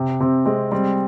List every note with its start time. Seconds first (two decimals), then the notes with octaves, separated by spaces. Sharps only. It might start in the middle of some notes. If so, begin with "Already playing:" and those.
Already playing: C3
0.20 C3 C4
0.46 G#3 C4
0.72 G3 C4